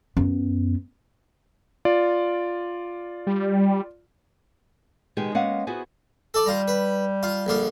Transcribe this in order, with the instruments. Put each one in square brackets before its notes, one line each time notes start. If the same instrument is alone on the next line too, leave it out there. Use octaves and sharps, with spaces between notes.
[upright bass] F#2 B3
[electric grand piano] F4 D5
[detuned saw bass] G3
[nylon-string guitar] B2 D#3 G#3 D#4 G4 G#4
G#3 A#3 B3 C#4 F5 F#5
B3 E4 F#4 G#4 C5 G#5
[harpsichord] A4 D5
[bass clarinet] G3 [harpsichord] F4 A#5
[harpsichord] B4
F4
A#1 D3 F4